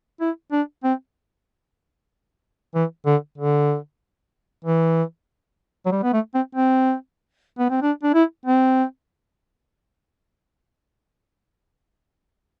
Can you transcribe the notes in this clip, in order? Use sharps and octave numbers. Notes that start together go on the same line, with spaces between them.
E4
D4
C4
E3
D3
D3
E3
F#3
G3
B3
A3
C4
C4
B3
C4
D4
D4
E4
C4